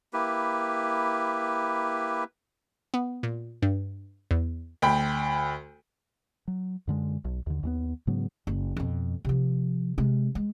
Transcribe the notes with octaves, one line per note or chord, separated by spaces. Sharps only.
A#3 E4 G4 B4
B3
A#2
G2
E2
D2 G5 B5
F#3
F#2 D3 G#3
B1
D#2 D3
D#2 G#3 B3
G#2 C#3 F#3 B3
F#1
F2 B2
C3 F3
C3 G#3
G#3